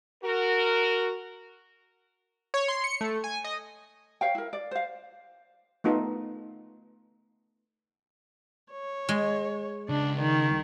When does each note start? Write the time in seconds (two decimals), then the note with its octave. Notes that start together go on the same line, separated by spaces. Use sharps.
0.24 F#4 A#4
2.54 C#5
2.68 C6
2.84 C#7
3.01 A3
3.24 G#5
3.44 D#5
4.21 C#5 F5 G5
4.35 E4 A#4
4.53 D5
4.71 C5 F5
5.84 A3 B3 D#4 F4 A4
8.73 C#5
9.09 G#3
9.89 C#2 D4
10.21 D#3